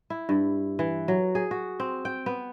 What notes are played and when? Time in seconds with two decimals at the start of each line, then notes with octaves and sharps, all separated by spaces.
0.10 E4
0.29 G2
0.79 E3
1.08 F#3
1.35 G#4
1.51 F#4
1.80 C4
2.05 G5
2.26 B3